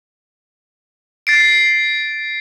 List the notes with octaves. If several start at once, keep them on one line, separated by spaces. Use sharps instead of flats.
A6 C7 D7